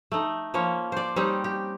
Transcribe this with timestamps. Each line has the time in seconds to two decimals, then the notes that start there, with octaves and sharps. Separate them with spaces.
0.12 A3 D#4
0.54 F3 A#3 C#4 C#5
0.92 C5 D5
1.16 G3 C4 C#4 D#4
1.44 G4